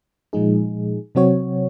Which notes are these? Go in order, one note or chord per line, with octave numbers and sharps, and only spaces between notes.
A#2 F3 G#3 D#4 G#4
C3 F#3 C4 F#4 C#5